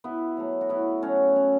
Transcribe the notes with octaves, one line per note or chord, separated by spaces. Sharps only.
B2 B3 E4
F#3 A3
F#4
B2 B3 E4
F#3 A3 C#4 F#4
C#4